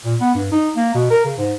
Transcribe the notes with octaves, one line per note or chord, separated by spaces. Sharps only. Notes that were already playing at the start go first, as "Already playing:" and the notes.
A#2
B3
G2
D#4
A#3
B2
A#4
C#3
G#2